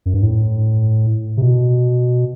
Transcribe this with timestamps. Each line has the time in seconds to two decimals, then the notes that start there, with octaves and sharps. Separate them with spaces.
0.06 F#2
0.14 G2
0.23 A2
1.37 C3
1.42 B2